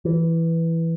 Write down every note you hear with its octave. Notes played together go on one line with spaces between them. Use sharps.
E3